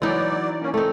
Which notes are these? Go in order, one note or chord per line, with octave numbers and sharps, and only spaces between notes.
E3 F#3 D#4 D5
A#3 C#4
A3 C4 D#4